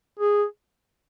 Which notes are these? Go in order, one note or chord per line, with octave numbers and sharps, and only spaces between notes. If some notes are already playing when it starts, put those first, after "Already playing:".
G#4